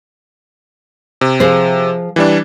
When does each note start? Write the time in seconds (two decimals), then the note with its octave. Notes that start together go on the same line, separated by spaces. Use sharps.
1.21 C3
1.40 F3 G#4 C5
2.16 E3 G3 D4